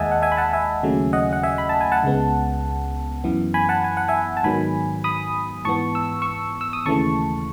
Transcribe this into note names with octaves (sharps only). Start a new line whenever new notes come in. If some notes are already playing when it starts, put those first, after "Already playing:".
Already playing: D#2 D#3 G#3 D#5 E5 F#5 G#5 A5
F#5
E5 G#5
B5
F#5 A5
E5 G#5
D#2 C#3 F#3 A3
D#5 F#5
F#5
E5 G#5
B5
A5
G#5
F#5 A5
C#2 C#3 G#3 B3
F#2 E3 B3
G#5 B5
F#5 A5
G#5
F#5
E5 G#5
A5
G#2 D#3 F#3 B3 G#5 B5
B5 D#6
G#2 E3 B3 A5 C#6
E6
C#6 E6
E6
D#6
D#2 C#3 E3 A3 A5 C#6